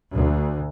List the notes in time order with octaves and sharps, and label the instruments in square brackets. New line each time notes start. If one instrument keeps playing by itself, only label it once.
[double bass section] D2